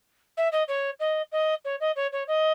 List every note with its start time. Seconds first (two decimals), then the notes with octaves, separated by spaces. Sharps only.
0.37 E5
0.52 D#5
0.68 C#5
1.00 D#5
1.32 D#5
1.64 C#5
1.80 D#5
1.96 C#5
2.12 C#5
2.27 D#5